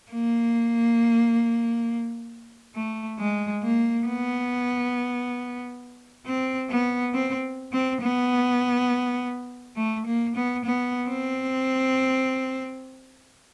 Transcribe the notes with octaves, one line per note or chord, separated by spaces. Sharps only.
A#3
A3
G#3
A#3
B3
C4
B3
C4
C4
B3
A3
A#3
B3
B3
C4